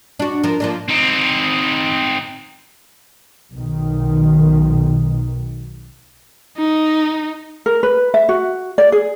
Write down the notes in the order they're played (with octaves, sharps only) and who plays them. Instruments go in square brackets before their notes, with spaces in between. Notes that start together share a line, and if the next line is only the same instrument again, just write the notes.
[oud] D4 F#4
F3 A#4
F3 A#3 D4
[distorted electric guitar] C4 D#4
[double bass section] B1 D#3
[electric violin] D#4
[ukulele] A#4
B4
E5
F#4
D5
G#4